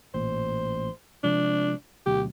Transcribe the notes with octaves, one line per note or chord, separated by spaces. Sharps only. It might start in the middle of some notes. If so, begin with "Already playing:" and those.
A1 A#2 C5
C3 F3 G#3 D4
D2 B2 F#3 G4